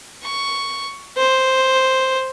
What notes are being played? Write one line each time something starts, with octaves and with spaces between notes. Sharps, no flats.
C#6
C5